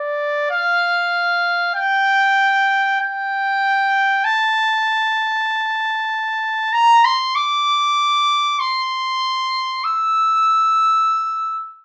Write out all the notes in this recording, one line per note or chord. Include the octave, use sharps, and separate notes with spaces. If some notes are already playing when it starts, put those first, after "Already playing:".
Already playing: D5
F5
G5
G5
A5
A#5
C6
D6
C6
E6